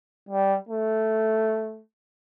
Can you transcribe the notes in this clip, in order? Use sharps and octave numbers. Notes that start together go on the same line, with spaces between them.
G3
A3